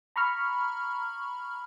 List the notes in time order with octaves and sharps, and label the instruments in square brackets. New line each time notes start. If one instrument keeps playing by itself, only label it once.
[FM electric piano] A#5 B5 C#6 F6